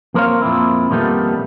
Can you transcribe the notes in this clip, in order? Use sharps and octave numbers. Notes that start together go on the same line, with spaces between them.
F2 A#3 A#4 C5 C#5 F5
F2 A#2 C4 E4
F2 A#2 D#3 G3 A3 B3